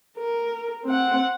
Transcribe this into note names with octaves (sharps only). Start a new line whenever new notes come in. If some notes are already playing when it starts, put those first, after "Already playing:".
A#4
C4 F#5